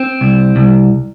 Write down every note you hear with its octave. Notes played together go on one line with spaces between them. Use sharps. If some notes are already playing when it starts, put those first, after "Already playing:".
Already playing: C4
C2
C2